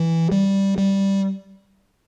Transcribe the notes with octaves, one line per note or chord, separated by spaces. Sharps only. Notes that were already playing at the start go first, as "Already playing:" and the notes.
Already playing: E3
G3
G3